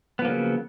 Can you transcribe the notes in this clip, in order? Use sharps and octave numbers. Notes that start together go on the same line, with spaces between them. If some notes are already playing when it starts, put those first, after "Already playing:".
C#3 F3 F#3 A#3 B3